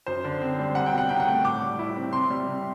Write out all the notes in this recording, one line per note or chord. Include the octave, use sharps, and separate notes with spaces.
F#2 C5
D3
C4
G3
C2 F#5
G5
B2
F#5
C2 G5
F#5
A3
A2 D6
G3
E4
C4
C3 C6
G3
C3